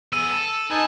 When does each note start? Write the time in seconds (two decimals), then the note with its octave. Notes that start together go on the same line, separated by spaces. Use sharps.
0.13 B3 G#4 E6 D#7
0.31 A4
0.70 D#4 G#4 B4 G#5 A5